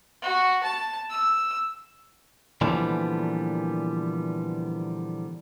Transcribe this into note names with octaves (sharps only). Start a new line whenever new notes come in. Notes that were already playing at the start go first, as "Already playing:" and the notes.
F#4
A5
E6
A#2 D3 E3 F3 G3 B3